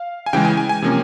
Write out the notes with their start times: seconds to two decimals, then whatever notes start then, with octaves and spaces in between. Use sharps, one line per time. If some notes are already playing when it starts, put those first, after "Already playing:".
Already playing: F5
0.26 G#5
0.33 C#3 E3 G#3 G5
0.45 G#5
0.57 G#5
0.69 G#5
0.82 C3 F3 A#3 C#4